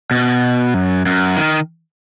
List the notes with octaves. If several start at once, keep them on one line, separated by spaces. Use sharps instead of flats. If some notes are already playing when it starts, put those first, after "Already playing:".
B2
F#2
F#2
D#3